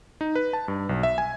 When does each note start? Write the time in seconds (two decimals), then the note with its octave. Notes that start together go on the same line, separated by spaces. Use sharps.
0.21 D#4
0.35 B4
0.53 A5
0.68 G2
0.89 B1
1.03 E5
1.18 G#5